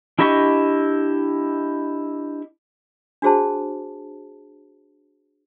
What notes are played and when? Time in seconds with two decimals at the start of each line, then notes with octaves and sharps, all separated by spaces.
0.19 D4 E4 G4 D#5 C#6
3.22 D4 F#4 G#4 C5 A5